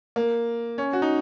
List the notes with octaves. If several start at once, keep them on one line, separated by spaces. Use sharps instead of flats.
A#3
C#4
F#4
D#4